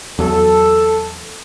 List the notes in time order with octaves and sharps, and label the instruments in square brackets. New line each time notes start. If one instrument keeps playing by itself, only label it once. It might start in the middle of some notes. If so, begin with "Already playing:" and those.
[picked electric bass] E2 F#3 [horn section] A4